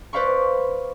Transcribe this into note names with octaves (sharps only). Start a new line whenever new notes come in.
B4 C5 D5 F5 B5 C#6